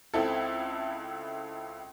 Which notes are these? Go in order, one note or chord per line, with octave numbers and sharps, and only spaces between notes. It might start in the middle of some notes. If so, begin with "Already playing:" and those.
C#2 C4 E4 A4